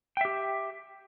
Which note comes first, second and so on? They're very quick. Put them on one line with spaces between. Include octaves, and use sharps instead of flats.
G5 E5 G4